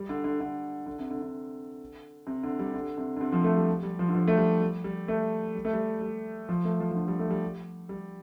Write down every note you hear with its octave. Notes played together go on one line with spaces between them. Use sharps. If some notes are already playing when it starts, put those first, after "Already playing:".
Already playing: G3
D3
D3
D3
D3
C3
D3
D3
C3
D3
G3
D3
C3
D3
C3
F3
A3
G3
G3
F3
D3
F3
A3
G3
G3
G3
A3
G3
A3
G3
G3
F3
A3
F3
F3
D3
G3
A3
G3
G3